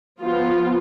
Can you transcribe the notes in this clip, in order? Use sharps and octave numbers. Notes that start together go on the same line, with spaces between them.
F3 B3 F4